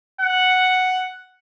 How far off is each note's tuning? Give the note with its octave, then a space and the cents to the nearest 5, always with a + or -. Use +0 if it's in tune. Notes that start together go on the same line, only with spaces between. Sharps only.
F#5 +0